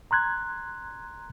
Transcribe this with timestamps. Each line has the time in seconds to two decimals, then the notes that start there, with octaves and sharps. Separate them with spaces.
0.11 A#5 C6 F#6 G#6